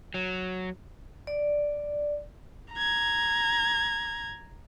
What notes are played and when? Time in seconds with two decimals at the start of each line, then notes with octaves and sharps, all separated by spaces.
0.14 F#3
1.27 D5
2.74 A#5 G#6